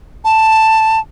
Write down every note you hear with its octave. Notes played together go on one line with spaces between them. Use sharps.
A5